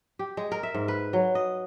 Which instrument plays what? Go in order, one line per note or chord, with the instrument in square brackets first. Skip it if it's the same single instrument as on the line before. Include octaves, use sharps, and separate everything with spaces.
[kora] G4
G#3
A#4
E5
G#2
B4
F#3
D#5